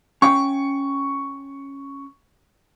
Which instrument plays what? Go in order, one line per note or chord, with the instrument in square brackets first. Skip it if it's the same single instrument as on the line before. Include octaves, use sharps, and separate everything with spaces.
[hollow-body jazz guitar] C#4 F5 G5 [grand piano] C#6